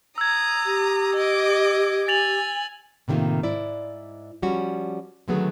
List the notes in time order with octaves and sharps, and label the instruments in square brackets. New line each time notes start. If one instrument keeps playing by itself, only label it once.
[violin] A#5 D#6 [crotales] E6 G#6
[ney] G4
[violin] D#5 D6
[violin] G#5 [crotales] A6 F7 F#7
[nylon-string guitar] A2 C3 D#3 G3 A#3 F4
G#2 E4 D5
F3 G3 C#4 F#4
D3 D#3 F#3 A3 B3 G#4